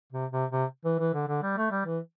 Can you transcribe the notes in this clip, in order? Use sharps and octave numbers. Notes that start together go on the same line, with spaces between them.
C3
C3
C3
E3
E3
D3
D3
G3
A3
G3
E3